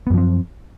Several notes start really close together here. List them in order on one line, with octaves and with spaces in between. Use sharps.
B3 F#2 F3 C4